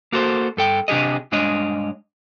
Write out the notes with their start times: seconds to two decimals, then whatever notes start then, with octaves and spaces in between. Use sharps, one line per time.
0.12 A#3 F#4 A4 C5
0.57 G2 A4 G5
0.88 C3 D4 G4 G#4 D#5
1.32 G2 G#3 D4 C#5 D#5